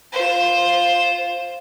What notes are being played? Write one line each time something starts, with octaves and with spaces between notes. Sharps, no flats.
F4 C5